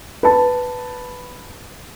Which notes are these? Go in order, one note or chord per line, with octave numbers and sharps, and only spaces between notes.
B4 A5